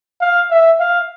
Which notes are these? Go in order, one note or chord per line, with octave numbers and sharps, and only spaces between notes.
F5
E5
F5